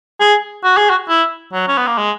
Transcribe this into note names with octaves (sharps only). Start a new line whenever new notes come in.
G#4
F#4
G#4
F#4
E4
F#3
C#4
B3
A#3
G#3